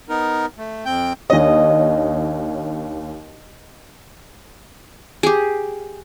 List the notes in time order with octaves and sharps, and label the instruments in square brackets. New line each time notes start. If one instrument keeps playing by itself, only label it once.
[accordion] B3 D#4 A#4
A3
F2 C4 G5 G6
[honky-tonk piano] D#2 D4 C#5 [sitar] D#5
[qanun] G4 G#4